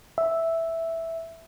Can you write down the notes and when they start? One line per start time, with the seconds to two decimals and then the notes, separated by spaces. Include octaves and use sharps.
0.18 E5